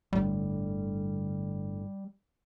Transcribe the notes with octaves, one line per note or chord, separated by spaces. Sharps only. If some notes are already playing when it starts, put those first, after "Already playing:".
G1 A2 D3 G3